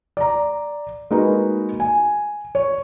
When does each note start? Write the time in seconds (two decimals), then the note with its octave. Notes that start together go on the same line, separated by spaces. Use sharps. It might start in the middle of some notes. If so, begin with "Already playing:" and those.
0.17 D5 A#5
1.11 G#3 A#3 D#4 F#4 B4
1.80 G#5
2.55 C#5